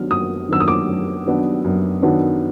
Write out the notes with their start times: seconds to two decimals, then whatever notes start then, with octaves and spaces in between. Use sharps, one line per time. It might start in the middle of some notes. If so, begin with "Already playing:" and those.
Already playing: D#3 F#3 B3 D4 F6
0.11 F#2 D#6
0.49 D#3 F#3 B3 D4 E6
0.60 D#6
0.68 D6
0.87 F#2
1.25 D#3 F#3 B3 D4
1.64 F#2
2.02 D#3 F#3 B3 D4